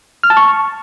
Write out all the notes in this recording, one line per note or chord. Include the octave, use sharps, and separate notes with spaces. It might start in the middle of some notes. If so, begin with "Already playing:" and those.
F6
A5
C#6